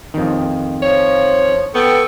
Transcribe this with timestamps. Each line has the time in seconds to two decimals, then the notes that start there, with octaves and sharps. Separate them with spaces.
0.14 F2 D#3
0.82 F3 C#5
1.75 B3 A4 G5 C#6